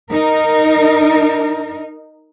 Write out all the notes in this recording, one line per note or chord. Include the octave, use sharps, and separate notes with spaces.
D#4 A#4